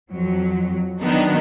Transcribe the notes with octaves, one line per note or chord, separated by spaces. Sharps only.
F2 F#3
D#3 F#3 B3 D4 D#4